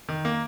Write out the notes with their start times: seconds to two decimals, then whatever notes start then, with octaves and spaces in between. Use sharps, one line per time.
0.09 D#3
0.25 A#3